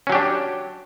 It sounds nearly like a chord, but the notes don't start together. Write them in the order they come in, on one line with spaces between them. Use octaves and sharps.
C#4 F#3 G4 D4